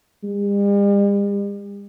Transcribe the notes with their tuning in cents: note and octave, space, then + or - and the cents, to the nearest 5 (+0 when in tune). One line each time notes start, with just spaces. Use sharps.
G3 +45